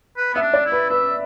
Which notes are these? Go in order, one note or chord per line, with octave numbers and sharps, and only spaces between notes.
B4
B3 E5
D4
D5
E4
B4
B4 E5